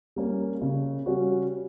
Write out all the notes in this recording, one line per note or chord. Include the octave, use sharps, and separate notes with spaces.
G3 A#3 C#4
C#3
G3 C#4 F#4